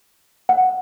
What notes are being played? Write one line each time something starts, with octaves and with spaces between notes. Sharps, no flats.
F#5